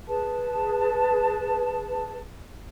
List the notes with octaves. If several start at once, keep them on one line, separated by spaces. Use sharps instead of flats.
G#4 B4 A5